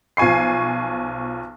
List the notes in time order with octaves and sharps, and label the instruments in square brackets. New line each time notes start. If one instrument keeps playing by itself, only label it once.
[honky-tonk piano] B1 F3 G#5 C#6 C7